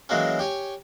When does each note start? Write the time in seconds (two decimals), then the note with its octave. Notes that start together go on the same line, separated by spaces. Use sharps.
0.09 E3 F#3 G#3 A#3 C#4
0.39 G4 C#5 G#5